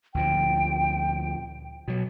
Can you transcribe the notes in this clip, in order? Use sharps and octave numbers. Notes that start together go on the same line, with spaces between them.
D2 A#2 F3 G5
B2 F#3